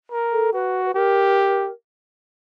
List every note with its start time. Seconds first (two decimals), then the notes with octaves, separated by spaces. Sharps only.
0.11 A#4
0.32 A4
0.53 F#4 B4
0.85 B4
0.95 G4 A#4